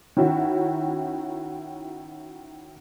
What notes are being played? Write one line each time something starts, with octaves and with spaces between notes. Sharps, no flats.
D#3 C#4 E4 F#4